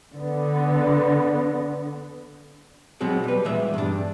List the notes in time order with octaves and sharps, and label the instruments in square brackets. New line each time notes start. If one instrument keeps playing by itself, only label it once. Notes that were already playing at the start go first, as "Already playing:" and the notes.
[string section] D3 B3
[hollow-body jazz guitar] B2 F#3 G#3 C4
G3 B4
A#2 E3 G#3 B3 E5
G2 D4